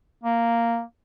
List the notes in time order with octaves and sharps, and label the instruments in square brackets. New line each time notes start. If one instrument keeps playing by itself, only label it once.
[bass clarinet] A#3